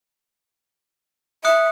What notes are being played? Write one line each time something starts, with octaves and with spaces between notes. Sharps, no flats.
E5 D#6 F#6 C#7